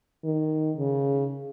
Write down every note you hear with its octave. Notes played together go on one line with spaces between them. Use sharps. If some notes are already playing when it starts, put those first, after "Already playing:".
D#3
C#3